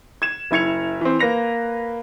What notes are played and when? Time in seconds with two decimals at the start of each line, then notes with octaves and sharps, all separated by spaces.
0.22 G#6 E7
0.51 F#1 E4 G#6 C#7 F7
1.01 E3 C4
1.19 A#3 B4 A#6 F7